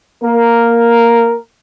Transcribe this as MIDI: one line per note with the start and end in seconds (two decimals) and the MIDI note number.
0.22 1.35 58
0.22 1.35 70